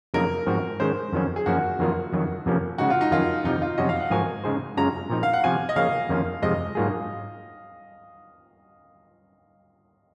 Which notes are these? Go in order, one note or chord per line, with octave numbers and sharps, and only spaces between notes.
F2 C#3 F#3 A#3 D#4 A#4
G#2 F3 C4 F#4
D#3 G#3 C#4 C5
F2 D#3 F#3 C#4
G#4
F#2 F3 A#3 C#4 F#4
F2 D#3 F#3 A#3 F4
F2 D#3 F#3
F2 C3 F3 A#3 C#4
C#3 G#3 D#4 F#4
F4
D#4
F2 D#3 F#3 C#4 F4
F2 C3 F3 D#4
F4
F2 C3 F#3 C#4 F#4 D#5
F5
F#5
G#2 F3 C4 F#4 A#4 G#5
C#3 G#3 D#4 G#4 C5
F#2 C#3 G#3 C#4 F4 A#5
A#2 F3 C4 D#4
F5
F#5
C3 F3 C4 F#4 G#5
D#5
C#3 F3 A#3 C#4 F5
F2 D#3 A#3 C#4 F4
F2 C3 F3 G#3 D#5
G#2 F#3 A#3 F4 G#4